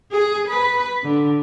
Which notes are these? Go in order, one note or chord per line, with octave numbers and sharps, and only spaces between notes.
G#4
B4
D3